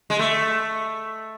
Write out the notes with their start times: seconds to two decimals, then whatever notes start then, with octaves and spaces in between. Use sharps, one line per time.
0.10 G#3
0.19 A3